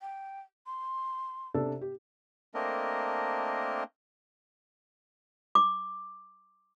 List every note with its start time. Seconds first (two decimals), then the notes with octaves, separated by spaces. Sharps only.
0.01 G5
0.66 C6
1.54 C3 D4 A4
1.81 G4
2.54 A3 A#3 C4 D4 A#4 D#5
5.55 D6